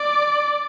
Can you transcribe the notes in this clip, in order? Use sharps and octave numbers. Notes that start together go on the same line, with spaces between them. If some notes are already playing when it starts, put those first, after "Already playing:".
Already playing: D5